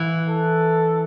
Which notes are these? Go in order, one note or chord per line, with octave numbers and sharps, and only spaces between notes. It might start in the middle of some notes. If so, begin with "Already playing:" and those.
Already playing: E3
A4